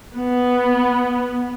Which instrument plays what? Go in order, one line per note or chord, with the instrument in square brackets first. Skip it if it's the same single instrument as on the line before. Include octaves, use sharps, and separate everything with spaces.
[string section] B3